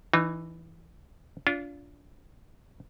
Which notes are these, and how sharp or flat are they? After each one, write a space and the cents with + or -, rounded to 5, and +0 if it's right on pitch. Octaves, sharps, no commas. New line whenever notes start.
E3 +0 D#4 -25
D4 -35 F4 +0